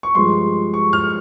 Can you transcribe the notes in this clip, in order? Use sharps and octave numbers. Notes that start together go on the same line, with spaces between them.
C#6
G2 F3 G#3 C6
C#6
F6